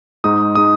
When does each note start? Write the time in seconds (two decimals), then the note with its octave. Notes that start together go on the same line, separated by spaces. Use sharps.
0.24 G#2 G#3 D#4 D#6
0.55 G#3 D#4 D#6